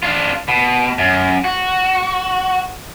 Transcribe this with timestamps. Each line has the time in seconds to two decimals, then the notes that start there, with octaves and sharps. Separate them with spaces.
0.03 D4 F4
0.48 B2
0.98 F#2
1.44 F#4